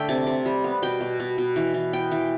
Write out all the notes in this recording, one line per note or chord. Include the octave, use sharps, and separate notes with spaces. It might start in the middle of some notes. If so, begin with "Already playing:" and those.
Already playing: D3 A3 D5 E5 G5
C3 A5
C3
G3
B3
B2 G5
B2
B2
B2
E3
E3
B3 G5
E3